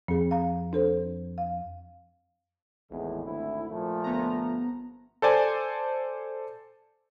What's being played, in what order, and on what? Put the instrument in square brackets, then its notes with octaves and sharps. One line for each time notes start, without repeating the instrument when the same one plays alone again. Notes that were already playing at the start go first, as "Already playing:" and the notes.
[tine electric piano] F2 [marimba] C4 G#4
[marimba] F5 A#5
D4 A4 C5
F5
[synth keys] G#1 [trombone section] E2 A2 G#3
[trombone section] D2 E4
A#2 F3 A3
[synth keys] G1 B3 A#5
[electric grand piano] A4 C5 D5 G#5